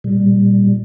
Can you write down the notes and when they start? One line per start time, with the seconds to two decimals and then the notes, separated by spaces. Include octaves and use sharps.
0.04 A#2 G3